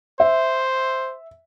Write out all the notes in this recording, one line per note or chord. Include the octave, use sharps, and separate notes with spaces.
C5 E5